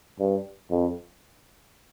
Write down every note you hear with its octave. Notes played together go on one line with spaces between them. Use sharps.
G2
F2